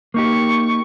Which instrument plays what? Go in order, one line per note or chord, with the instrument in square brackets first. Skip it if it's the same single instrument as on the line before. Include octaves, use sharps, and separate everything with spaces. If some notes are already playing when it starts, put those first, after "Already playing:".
[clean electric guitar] A#3 D#4 G4 [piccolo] C#6